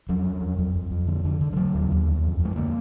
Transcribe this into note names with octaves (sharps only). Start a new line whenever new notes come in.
F2 F#3
F2
F2
F2
F2
F2
D3
D3
D3
F3
D3 F#3
D#2
D#2
F2
F2
F2
G#3
D3 A#3